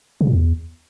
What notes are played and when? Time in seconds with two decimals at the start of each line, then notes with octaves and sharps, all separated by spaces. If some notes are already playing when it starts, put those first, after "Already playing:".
0.21 C#3
0.27 A#2
0.33 E2